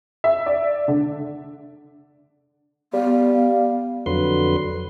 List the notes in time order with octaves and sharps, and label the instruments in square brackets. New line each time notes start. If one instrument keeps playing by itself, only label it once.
[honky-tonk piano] E5
D5
D3
[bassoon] G3 [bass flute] B3 [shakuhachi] F5
[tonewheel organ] F2 D3 F#3 B4 C6